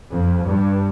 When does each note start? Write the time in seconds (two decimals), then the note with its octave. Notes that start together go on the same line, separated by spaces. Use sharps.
0.12 F2
0.47 G2